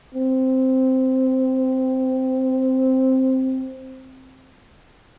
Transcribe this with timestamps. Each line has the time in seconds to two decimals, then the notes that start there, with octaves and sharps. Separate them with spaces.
0.15 C4